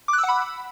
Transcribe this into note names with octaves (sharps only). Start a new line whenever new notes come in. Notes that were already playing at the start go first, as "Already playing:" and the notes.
D6
F#6
E6
F#5
B5